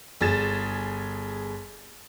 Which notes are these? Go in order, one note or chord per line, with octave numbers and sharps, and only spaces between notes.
G1 G#4 A6 E7